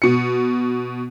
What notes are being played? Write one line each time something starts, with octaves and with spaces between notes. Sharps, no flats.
B2 C#7